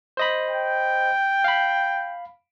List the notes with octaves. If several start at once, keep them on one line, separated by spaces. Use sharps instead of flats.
C5 D#5 B5
G5
F5 B5